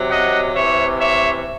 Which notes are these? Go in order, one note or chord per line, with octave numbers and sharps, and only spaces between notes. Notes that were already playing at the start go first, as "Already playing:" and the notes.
Already playing: C3 F#3
D#5 F#5
C3 E3 C#5 E5
C#5 E5